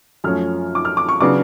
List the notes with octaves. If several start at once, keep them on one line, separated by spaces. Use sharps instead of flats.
F#2 F3 A3 C#4 F6
D6
F6
D6
C#6
C#3 F#3 B3 D4 D6